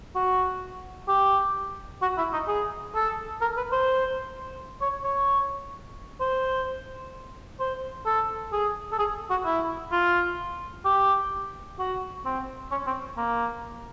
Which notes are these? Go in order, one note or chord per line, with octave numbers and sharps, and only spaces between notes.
F#4
G4
F#4
E4
D#4
G#4
A4
A#4
B4
C5
C#5
C#5
C5
C5
A4
G#4
A4
G#4
F#4
E4
F4
G4
F#4
C4
C#4
C4
A#3